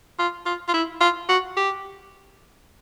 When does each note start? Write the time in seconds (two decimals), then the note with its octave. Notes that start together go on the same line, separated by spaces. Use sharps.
0.19 F4
0.46 F4
0.68 F4
0.74 E4
1.01 F4
1.29 F#4
1.57 G4